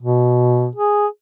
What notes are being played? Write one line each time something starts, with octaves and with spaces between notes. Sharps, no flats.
B2
G#4